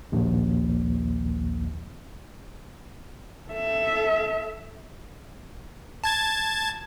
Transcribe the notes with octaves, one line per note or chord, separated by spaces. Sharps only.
A#1 D#2
A4 E5
A5 G#6 A6